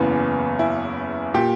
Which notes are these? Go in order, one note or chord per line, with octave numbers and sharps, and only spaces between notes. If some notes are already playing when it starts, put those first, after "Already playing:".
Already playing: F#1 E2 C#3 E3 B3
E4
A#2 G4